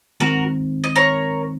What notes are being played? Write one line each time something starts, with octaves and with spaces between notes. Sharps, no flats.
D#3 G#3 C4 D#4 F#4 A#4
D#5
A#4 C#5